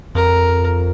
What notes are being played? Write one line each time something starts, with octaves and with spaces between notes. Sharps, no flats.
F2 A#4